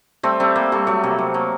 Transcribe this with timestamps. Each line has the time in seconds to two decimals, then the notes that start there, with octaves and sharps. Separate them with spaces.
0.23 G3 A3 C4
0.40 G3 A3 C4
0.56 G3 A#3
0.72 G3 A3
0.87 F#3 A3
1.03 C3 A#3
1.18 F#3 A3
1.34 F#3 A#3